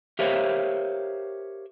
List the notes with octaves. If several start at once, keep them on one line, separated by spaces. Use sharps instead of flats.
G4 A#4 C5 C#5 E5 F5